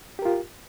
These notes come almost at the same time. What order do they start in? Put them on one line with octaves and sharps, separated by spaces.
G4 A#4 F4